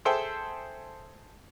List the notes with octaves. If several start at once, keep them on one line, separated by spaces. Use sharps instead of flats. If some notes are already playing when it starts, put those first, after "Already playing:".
G#4 A4 C5 E5 G5